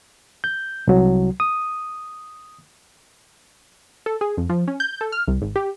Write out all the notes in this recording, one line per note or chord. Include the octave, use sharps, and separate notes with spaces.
G6
C2 F#3
D#6
A4
G#4
F2
F3
C#4
G6
A4
F6
C2
G#1
G4